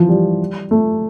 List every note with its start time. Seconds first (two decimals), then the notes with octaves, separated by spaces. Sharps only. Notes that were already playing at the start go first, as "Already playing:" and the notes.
Already playing: E3 F3
0.09 G3
0.71 A3